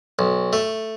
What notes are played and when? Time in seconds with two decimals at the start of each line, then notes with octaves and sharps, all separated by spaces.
0.19 B1
0.53 A3